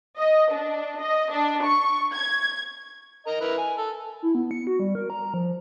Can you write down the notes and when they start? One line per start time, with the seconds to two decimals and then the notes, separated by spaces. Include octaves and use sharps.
0.18 D#5
0.53 D4
1.00 D#5
1.32 D4
1.65 C#6
2.15 G#6
3.27 A#4 D#5 A#5
3.41 E4 A#4 B4
3.58 G#5
3.78 A4
4.23 E4
4.35 B3
4.51 C#7
4.67 F#4
4.79 G3
4.95 A#4
5.10 A#5
5.34 F3